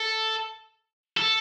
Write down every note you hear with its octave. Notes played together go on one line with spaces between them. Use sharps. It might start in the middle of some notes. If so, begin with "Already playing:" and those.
Already playing: A4
A4